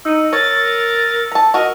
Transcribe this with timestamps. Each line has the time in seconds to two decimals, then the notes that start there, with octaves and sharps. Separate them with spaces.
0.05 D#4 E6 C#7 D#7
0.33 A#4 C#5 A6
1.32 A5 A#5
1.54 F#4 A#4 D#5